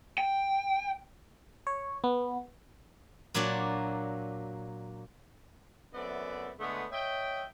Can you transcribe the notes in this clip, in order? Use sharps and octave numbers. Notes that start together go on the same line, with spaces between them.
G5
C#5
B3
A#2 F#3 A#3 D4 F#4 D5
F#2 A3 B3 C4 D5 E5
D3 G#3 A3 B3
C#5 D#5 E5 G5